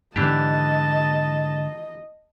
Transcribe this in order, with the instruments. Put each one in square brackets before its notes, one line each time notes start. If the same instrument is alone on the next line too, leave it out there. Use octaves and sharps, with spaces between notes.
[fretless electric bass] G#2 D3 B3 [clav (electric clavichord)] E3 D4 G4 [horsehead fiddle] D#5 [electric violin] A5